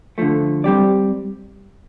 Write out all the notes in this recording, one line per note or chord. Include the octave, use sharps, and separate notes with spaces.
D3 F3 A3
G3 C4 G4 D5